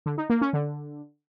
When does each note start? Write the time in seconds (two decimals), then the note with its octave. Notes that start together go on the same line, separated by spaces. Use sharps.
0.06 D3
0.18 D#4
0.30 A#3
0.41 C#4
0.53 D3